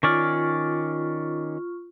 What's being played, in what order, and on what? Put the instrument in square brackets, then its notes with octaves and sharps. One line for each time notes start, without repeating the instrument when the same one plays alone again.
[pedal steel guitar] D#3 C#4 D5 [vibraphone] F4 [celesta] C#6 F6